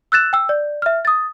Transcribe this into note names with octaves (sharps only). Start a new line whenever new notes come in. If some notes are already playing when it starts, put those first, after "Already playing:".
E6 F#6 A6 E7
G5 E6
D5
E5 F6
D#6 A6